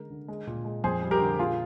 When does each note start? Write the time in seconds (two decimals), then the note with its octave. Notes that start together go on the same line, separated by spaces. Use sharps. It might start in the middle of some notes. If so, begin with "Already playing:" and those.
Already playing: D3 G#3 A#4
0.10 D3
0.28 G#3
0.47 A#2
0.65 G#3
0.84 F2 G#4 C5
1.02 G3
1.11 G4 A#4
1.21 D3
1.38 A#2 F4 G#4